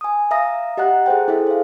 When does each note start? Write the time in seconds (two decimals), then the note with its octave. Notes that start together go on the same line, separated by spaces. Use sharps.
0.01 G#5 D#6
0.31 E5 F5 A#5 D#6 A#6
0.77 G4 D#5 F#5 A#5 F#6
1.06 G#4 A4 C5 G5
1.28 E4 G#4 A4 E5
1.47 C5 F5